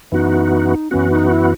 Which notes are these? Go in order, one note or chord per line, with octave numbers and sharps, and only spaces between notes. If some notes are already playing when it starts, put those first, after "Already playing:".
F#2 E3 B3 D#4 F#4
F#2 E3 B3 C#4 F#4
D#4
E4